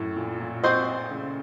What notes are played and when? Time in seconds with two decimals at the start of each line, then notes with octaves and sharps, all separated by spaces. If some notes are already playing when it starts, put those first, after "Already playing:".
Already playing: F#2 A2
0.16 A#2
0.40 A#2
0.64 C4 F#4 C5 D#5
1.11 C#3